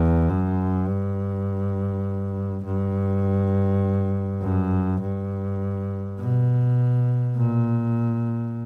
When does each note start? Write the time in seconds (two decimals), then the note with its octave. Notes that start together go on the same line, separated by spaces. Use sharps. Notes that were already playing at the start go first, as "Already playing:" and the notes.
Already playing: E2
0.29 F#2
0.88 G2
2.65 G2
4.43 F#2
5.02 G2
6.19 B2
7.37 A#2